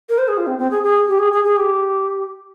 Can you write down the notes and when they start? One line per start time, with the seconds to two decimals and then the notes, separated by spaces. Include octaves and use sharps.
0.09 A#4
0.18 C5
0.28 G#4
0.38 F4
0.47 C4
0.59 C4
0.71 G#4
0.83 G#4
1.08 G4
1.19 G#4
1.32 G#4
1.44 G#4
1.57 G4